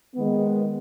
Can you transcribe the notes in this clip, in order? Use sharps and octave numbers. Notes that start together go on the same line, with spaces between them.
D#3 G#3 B3